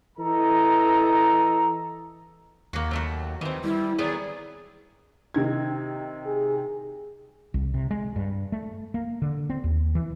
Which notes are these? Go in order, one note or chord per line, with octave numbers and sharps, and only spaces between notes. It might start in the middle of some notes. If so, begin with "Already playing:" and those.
E3 A4 D#5 A#5
D#2 A#3 F#4
F#3 A3 F#4
D#3 E3 C4
G3 E4
D#3 F#3 B3 G#4 D5
C3 D#3 G#6
G#4
C2
C3
G#3
G2
A3
A#3
D3
C4
D#2
E3